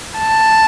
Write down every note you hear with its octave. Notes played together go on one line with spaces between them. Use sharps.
A5